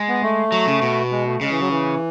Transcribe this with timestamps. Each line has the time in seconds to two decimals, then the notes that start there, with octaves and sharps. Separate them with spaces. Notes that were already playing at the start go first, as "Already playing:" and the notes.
Already playing: G#3
0.08 B3
0.22 A3
0.52 F#3
0.67 C#3
0.82 B2
1.11 G#3
1.27 A3
1.41 C#3 G#3
1.50 E3
1.60 F#3
1.70 E3